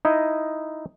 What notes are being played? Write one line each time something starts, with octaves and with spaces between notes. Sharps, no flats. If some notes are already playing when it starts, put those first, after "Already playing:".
D#4 E4 D#5